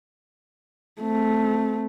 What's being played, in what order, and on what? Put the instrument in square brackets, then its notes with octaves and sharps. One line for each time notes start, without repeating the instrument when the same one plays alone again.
[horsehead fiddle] A3 C4